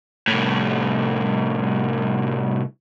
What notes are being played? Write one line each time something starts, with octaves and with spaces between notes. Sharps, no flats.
C2 A2